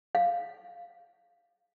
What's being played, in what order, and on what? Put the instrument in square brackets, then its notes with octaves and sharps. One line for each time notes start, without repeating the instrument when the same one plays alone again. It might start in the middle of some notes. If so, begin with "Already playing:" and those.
[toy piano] F5